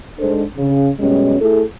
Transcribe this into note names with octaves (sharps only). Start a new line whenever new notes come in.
G#2 G#3 D4 A4 C5
C#3
F#2 B2 G3 G#3 C#4
A3 E4 G#4 A4